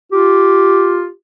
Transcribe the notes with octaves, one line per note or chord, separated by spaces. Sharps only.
F4 G4